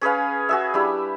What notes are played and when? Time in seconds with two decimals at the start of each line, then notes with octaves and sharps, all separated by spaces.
0.01 C#4 G#4 B4 F5
0.49 F#4 G#4 E5
0.74 G3 D4 E4